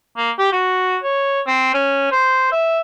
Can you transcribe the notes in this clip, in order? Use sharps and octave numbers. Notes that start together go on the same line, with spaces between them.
A#3
G4
F#4
C#5
C4
C#4
C5
E5